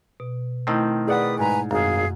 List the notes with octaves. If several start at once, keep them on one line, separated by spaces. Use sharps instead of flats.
B2
D#3 A3 C4 E4
G#4 B4 D5 F#5 D#6
G#2 B4 G#5 A#5
G#1 F#2 G#4 F5